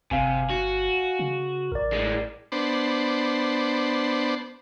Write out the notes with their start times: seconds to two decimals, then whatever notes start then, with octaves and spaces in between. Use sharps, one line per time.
0.11 G1 C3 F5 G#5
0.50 F#4
1.19 C#3
1.72 A1 A#4 D5
1.92 A2 G#3
2.52 B3 D4 C5